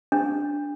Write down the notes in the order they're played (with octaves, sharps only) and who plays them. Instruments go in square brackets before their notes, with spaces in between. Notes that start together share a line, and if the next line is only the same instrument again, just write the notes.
[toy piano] D4